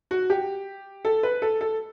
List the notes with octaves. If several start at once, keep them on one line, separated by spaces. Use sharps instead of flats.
F#4
G4
A4
B4
A4
A4